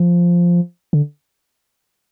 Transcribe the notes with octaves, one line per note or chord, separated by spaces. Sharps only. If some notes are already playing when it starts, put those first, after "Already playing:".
Already playing: F3
D3